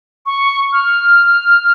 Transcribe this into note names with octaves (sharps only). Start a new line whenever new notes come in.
C#6
F6